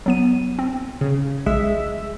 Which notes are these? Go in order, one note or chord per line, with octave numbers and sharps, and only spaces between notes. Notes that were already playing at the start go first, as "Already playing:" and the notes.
F#3 B3 D#7
C4
C#3
B1 G#3 E5